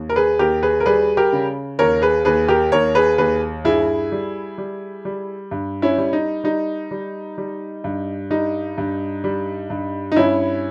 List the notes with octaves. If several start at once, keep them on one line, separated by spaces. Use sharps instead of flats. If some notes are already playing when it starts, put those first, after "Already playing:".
Already playing: D#2
A#4
G#4 B4
D#2 G4 A#4
G#4 B4
A#4
G3 G#4 B4
G4 A#4
C#3
D#2 A#4 C#5
G#4 B4
D#2 G#4 B4
G4 A#4
D#2 A#4 C#5
G#4 B4
D#2 G#4 B4
G2 E4 G#4
G3
G3
G3
G2
C#4 E4
G3
D#4
G3 D#4
G3
G3
G2
G3 D#4
G2
G3
G2
D#4
G2 C#4 E4